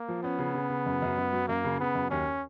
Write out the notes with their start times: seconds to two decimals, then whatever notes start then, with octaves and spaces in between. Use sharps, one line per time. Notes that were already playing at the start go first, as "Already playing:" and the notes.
Already playing: A#3
0.08 F3
0.23 B3 C#4
0.39 C#3
0.55 C#3
0.70 C#3
0.86 F#2
1.02 F#2
1.17 F#2
1.33 F#3
1.48 F#2 A#3
1.64 C#3
1.80 C#3 B3
1.95 F#2
2.10 D#2 C#4